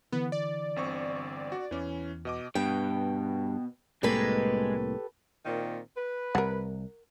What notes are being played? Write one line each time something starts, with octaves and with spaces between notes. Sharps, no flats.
D3 E3 B3
D5
G1 C4 C#6
F#4
E2 E3 C#4
B2 D#5 D6
G2 B2 G5
C2 A2 G#3 A#3 G4 A4 B4
A#2 D#3 C4
B4
C2 A#4 F#5